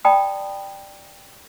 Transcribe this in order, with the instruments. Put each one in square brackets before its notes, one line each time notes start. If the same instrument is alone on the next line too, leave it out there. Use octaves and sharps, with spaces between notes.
[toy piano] D5 G5 A5 B5 D#6